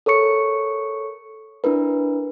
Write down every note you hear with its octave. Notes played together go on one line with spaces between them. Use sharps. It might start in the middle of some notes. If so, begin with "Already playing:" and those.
A4 A#4 C#5 C#6 C#7
D4 E4 A#4 B4